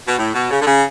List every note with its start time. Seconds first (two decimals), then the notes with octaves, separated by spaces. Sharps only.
0.08 B2
0.19 A2
0.34 B2
0.51 C#3
0.62 D3
0.67 C#3